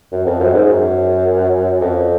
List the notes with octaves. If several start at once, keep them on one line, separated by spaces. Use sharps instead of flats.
F#2
F2
F#2
G#2
F#2
F2